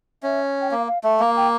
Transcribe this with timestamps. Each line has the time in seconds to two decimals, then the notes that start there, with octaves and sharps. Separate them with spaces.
0.23 C#4 E5
0.61 G5
0.71 A#3 F5
0.87 F5
1.04 A3 E5
1.19 A#3 F5
1.37 G5